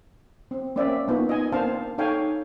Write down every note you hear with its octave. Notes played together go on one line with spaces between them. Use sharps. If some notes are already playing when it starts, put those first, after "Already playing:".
C4
A#3 C4 C#4 D5 E5
A#3 B3 D#4 F4
D#5 G#5
A#3 C4 D4 C5 F5 A5
D#4 A4 C#5 F5 G5 G#5